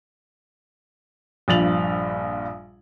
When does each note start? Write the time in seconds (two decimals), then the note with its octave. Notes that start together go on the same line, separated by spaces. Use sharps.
1.48 A#1 G2 F3 A6 F7 F#7